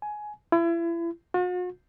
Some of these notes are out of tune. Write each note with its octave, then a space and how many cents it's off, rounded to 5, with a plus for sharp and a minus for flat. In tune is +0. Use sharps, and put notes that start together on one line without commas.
G#5 +15
E4 +35
F#4 -45